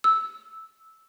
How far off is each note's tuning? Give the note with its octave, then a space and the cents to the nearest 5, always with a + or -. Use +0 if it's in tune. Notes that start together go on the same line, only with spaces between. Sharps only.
E6 -10